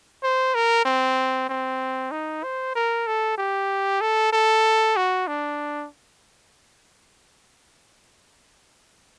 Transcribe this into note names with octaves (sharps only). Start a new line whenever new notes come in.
C5
A#4
C4
C4
D#4
C5
A#4
A4
G4
A4
A4
F#4
D4